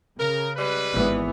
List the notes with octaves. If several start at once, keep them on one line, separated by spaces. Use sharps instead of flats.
C#3 A#4
G3 G#3 B4
G#1 E3 B3